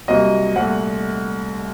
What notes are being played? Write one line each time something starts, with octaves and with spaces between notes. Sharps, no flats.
C2 C3 F#3 A#3 D#5
C2 A#2 A3 F#5